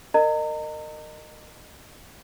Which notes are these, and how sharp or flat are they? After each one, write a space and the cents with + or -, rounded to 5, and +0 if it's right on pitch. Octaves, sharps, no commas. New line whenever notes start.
A#4 -25 D#5 -25 A#5 -35